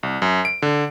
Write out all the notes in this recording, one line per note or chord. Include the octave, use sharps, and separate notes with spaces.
C2
F#2
D7
D3